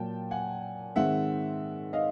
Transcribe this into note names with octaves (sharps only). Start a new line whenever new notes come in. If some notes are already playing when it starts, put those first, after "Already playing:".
Already playing: A#2 F#3 A#3 G5 A5
F#5 G#5
G#2 D#3 G#3 C4 E5 F#5
D#5 F5